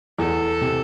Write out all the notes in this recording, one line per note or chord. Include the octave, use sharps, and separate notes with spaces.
E2 A4
C3